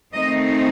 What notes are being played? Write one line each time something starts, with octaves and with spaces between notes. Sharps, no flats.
D#3 A3 C4 D#4 D#5